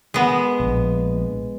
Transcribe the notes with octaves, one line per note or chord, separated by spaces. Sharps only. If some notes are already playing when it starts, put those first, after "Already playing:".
G#3 B3
A#1